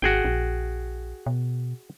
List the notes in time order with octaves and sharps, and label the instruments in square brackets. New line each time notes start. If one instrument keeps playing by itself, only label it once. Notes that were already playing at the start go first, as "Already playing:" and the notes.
[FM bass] G#1 [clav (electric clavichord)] F#4 G#4 G5
[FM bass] A#1
B2